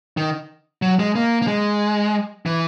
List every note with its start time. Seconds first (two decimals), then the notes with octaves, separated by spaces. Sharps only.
0.17 D#3
0.82 F#3
0.99 G#3
1.15 A#3
1.42 A#3
1.47 G#3
2.46 E3